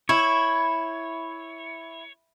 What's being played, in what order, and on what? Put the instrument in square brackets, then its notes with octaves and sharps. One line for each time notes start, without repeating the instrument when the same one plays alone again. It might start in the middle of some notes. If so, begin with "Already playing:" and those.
[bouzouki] E4 [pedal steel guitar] C#5